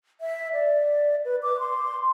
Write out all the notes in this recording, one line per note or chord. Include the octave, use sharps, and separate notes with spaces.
E5
D5
B4
D6
C6